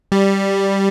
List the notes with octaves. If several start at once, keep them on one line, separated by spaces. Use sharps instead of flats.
G3